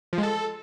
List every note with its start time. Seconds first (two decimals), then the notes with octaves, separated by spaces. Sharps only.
0.13 F3
0.18 G#3
0.23 A4